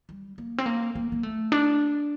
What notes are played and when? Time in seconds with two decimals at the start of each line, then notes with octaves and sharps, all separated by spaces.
0.09 G3
0.38 A#3
0.58 C4
0.66 A#3
0.95 A#3
1.12 A#3
1.23 A3
1.52 D4